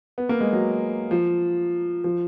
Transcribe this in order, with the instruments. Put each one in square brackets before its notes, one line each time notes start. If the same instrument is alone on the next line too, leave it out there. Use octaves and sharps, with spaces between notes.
[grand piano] B3
A#3
G#3
F#3
F3
F3